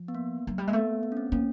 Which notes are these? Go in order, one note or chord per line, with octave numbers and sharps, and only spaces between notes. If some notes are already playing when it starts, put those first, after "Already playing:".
Already playing: F3
B3
A#3
F#3
G3
G#3 A#3
A3 B3
B3
C#4
C4
A#3 C#4